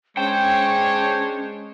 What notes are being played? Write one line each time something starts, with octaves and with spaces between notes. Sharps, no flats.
G#3 C#4 D4 C5 C#5 G5